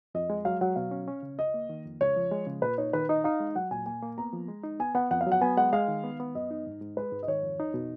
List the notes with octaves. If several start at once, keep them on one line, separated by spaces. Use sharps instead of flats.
F2 D#5
G#3
F#3 F5
F#3 F#5
B2 F5
C#4
C#4
C#3
C#2 D#5
A#3
D#3
F2
C#2 C#5
F3
G#3
C#3
A#2 B4
D#4 C#5
D#3 B4
D#4 D#5
D#4 F5
G#3
F#3 F#5
A#2 G#5
A#3 G#5
A#3
B3 A#5
F3
G#3
D#4
B3 G#5
B3 F#5
F2 F#5
F5
F#3
F#5
B3 G#5
G#3 F#5
G#3 F5
D#3
B3
B3
F#2 D#5
D#4
G#2
G#2
G#3 B4
G#2
D#5
D#3 C#5
F2
D#4
B2